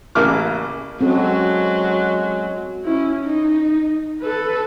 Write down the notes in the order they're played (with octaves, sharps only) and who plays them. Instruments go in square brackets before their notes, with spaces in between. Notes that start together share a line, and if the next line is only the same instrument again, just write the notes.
[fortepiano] A1 C#3 A#3 E4 D6 F6
[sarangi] F#3 [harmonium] G#3 [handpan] C4 C#4 A4
[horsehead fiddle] C#4 E4
D#4
A4 B4